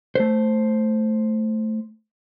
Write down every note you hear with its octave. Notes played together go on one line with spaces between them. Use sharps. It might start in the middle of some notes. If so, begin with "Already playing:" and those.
A3 C5